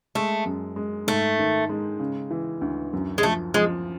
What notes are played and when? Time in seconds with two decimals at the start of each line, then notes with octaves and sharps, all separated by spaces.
0.15 G#3 A3
0.46 F#2
0.76 G#3
1.07 G#2 A3
1.39 D#3
1.69 G#3
2.00 C#3
2.31 E3
2.61 D2
2.93 F#2
3.18 G#3
3.23 F3 A3
3.54 F3 G#3